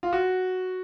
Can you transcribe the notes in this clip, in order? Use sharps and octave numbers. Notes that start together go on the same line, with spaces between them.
F4
F#4